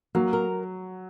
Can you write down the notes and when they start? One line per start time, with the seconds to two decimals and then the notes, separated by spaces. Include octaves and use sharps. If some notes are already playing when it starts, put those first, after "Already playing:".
0.15 F#3 A#3
0.33 A#4